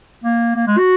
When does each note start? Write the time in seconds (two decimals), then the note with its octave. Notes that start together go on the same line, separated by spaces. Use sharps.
0.24 A#3
0.56 A#3
0.67 G#3
0.78 F#4